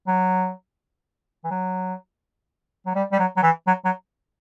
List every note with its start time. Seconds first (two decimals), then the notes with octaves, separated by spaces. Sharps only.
0.07 F#3
1.44 E3
1.51 F#3
2.86 F#3
2.95 G3
3.12 G3
3.19 F#3
3.37 F#3
3.43 E3
3.67 F#3
3.85 F#3